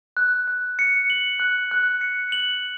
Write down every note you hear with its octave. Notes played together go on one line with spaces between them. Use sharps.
F#6
F#6
C#7
F#7
F#6
F#6
C#7
F#7